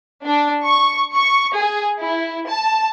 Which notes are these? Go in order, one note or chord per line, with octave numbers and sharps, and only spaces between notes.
D4
C#6
C#6
G#4
E4
A5